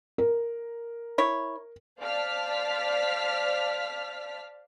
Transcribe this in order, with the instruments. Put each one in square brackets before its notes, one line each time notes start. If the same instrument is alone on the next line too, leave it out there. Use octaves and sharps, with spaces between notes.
[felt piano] A#4
[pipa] E4 C#5
[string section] C5 D5 F5 A5 F6 B6